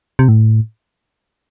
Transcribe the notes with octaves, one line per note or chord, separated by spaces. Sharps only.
C3
A2